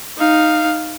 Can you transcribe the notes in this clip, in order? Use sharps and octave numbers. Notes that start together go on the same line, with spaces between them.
D#4 F5